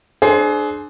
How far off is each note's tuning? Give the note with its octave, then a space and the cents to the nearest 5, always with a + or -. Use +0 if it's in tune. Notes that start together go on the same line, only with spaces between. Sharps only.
D4 +20 G#4 +35 C5 +0